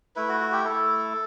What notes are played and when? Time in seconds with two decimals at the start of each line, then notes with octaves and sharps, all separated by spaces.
0.16 A3 E4 B4
0.29 F#4
0.40 F#4
0.52 G4
0.64 A3 E4 A4